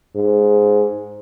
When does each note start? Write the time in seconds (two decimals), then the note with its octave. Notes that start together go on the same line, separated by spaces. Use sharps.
0.16 G#2